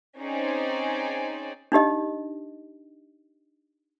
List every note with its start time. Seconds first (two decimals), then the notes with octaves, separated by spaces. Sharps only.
0.17 C4 C#4 D#4 G#4 C5 D5
1.72 D4 D#4 G4 D#5